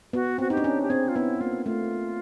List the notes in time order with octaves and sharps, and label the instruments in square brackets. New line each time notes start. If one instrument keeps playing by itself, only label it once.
[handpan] B3 [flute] F#4
[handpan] C4 [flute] F#4
[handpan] D#4 [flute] G4
[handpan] D4
C#4
[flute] G4
[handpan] C4 [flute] G#4
[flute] F4
[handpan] B3 [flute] E4
[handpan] A#3 [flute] F4
[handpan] A3 [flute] F4